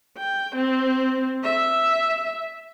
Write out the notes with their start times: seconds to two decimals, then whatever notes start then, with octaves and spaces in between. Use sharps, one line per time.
0.18 G5
0.55 C4
1.44 E5